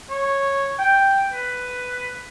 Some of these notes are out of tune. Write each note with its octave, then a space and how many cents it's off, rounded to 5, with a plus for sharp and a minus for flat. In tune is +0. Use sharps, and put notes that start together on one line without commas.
C#5 -10
G5 +0
B4 +10